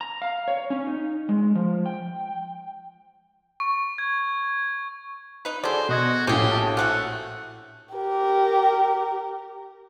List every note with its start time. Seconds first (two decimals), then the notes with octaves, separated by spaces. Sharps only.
0.01 A#5
0.22 F5
0.48 C#5
0.70 C#4
0.87 D#4
1.29 G#3
1.55 F3
1.86 G5
3.60 C#6
3.98 G#6
5.45 D#4 B4
5.64 F#3 D4 G#4 A4 C5 D5
5.89 B2 F#4 D#5 G#6
6.27 A#1 A2 C#4 G4 G#4 G5
6.52 F#4 A5
6.77 C3 A3 C#4 F#5
7.95 G4 A#4